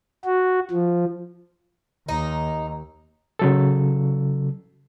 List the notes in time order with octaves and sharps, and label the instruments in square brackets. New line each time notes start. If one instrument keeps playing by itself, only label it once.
[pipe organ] F#4
F3
[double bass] D#2 [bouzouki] D#4
[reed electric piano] C#3 F#3 A4